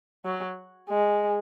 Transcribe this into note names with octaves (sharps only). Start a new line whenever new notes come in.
F#3
G#3